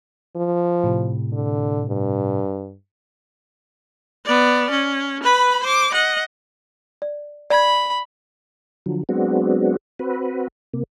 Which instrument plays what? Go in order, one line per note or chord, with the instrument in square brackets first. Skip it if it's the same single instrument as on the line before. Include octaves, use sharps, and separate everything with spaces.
[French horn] F3
[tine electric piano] A2 C3
[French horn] D3
G2
[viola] B3 D5
C#4
B4 B5
C5 D6
D#5 F#5
[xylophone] D5
[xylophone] D5 G#6 [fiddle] B5
[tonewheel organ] D3 F3 F#3
F#3 G#3 B3 C4 D4 F#4
C4 F#4 B4
C3 A#3